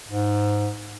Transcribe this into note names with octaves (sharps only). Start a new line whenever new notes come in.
G#2